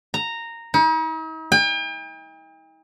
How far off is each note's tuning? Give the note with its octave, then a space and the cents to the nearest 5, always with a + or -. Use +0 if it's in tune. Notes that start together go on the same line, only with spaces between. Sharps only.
A#5 -10
D#4 +45
G5 +40